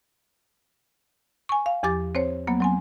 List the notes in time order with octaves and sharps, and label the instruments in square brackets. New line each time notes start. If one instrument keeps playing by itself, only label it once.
[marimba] G#5 C#6
F5
E2 F3 G4 D6 A6
C4 C5 C#5
F#3 A#3 B3
F#3 C4 G#5